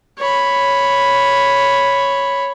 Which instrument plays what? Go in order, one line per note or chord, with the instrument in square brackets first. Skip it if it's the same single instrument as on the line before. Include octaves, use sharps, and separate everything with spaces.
[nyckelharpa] C#5 B5